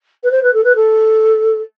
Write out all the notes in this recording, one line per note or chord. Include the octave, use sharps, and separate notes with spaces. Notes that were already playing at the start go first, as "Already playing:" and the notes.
B4
C5
B4
A4
B4
A4